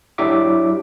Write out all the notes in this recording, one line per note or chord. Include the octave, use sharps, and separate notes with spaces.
F#3 D4 E4 G4 E5 D6